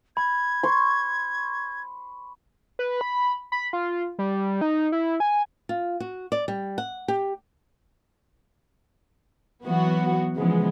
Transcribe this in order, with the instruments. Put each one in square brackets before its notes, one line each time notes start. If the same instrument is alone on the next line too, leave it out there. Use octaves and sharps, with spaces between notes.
[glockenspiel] B5 [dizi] G#6
[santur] C6 C#6
[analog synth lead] B4
B5
B5
F4
G3
D#4
E4
G#5
[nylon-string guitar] F4
F#4
D5
G3
F#5
G4
[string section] E3 F#3 B3 F#4
C#3 E3 F3 G#3 B3